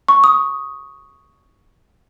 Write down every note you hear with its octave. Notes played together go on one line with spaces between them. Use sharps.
C#6
D#6